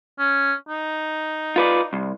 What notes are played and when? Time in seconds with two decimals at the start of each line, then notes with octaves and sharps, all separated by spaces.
0.19 C#4
0.69 D#4
1.56 F4 B4 D5
1.93 C2